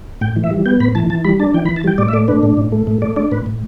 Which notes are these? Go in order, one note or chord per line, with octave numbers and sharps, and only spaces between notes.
A2 G5
E3
E5
G3
B3 G5
A2 B5
E3 A5
E3 A5
G3 B5
D4 A5
E3 G5
B5
E3
A5
G3 G5
A2 D5
E5
A3 D5
D4 B4
A2
A2
A3
A2
A3 D5
D4 D5
A2 B4
A2